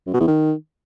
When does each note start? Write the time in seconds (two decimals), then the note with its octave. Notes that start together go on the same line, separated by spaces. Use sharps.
0.07 F#2
0.14 B2
0.21 E2
0.27 D#3